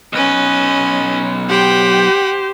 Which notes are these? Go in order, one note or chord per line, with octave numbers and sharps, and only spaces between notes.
B1 C#4 B4 D#5
G4 C5 F#5 G5